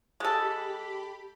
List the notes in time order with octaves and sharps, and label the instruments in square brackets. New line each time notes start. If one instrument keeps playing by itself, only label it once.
[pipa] G#3 A4 [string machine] G4 B5